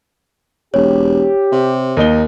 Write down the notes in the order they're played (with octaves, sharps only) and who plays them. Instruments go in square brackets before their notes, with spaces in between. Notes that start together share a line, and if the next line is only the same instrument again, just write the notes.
[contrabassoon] E1 [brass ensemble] G4 [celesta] C#5
[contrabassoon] C3
[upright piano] D#2 D#4 G7